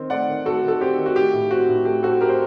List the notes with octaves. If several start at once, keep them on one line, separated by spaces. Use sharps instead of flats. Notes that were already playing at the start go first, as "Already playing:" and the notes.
Already playing: D#3 C4
A3 D5 F#5
D#3
A3 F#4 A4
D#3
A4
C4 G4
D#3
F#4
A3 G4
A2
C4 F#4
A2
A3 G4
C4 F#4 A4
A3 G4 A#4
C5